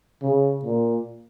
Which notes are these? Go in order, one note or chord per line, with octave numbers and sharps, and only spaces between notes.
C#3
A#2